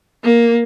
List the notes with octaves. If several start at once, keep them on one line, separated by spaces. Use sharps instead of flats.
A#3